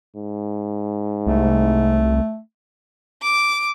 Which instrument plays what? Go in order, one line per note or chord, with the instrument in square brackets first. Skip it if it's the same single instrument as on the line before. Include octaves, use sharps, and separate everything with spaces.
[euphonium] G#2
[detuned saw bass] C2 [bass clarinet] A3
[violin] D6